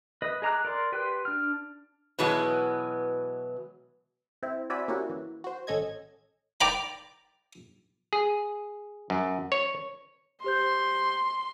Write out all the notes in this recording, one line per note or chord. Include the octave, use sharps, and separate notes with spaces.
B4 D#5
G#4 D#5 A#5 D6 F#6
A#4 D5 C6
G4 B4 G5 C6 F#6
D4 F6
B2 E3 F#3 G#3 B3
C4 E4
C4 F#4 D5 E5 G#5 B5
A#3 C#4 E4 F#4 G4
E3
F#4 C5
A1 C#4 A4 D#5 G#6
D5 G5 A#5 B5
G#4
F#2
C#5
G4 C5 C6 G6